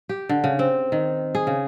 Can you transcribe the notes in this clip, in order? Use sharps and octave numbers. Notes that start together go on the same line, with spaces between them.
G4
D3
C#3
C4
D#3
G#4
C#3